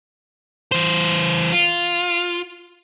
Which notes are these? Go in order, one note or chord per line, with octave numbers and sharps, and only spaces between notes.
E3 C5
F4